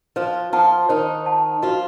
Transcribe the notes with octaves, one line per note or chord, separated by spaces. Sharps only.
F3 F4 C5
F3 F4 F#5 A5
D#3 D#4 C5
F#5 A5
F3 F4 F#4